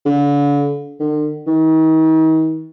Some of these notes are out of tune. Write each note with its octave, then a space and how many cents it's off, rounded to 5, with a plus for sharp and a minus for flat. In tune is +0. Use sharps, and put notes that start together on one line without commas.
D3 -40
D3 +45
D#3 +40